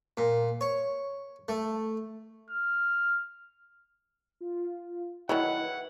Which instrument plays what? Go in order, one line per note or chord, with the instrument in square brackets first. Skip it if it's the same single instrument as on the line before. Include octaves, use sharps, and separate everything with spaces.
[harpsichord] A#2
C#5
A3
[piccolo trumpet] F6
[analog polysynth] F4
[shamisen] D#3 F#3 [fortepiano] E4 [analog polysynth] B4 [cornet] F#5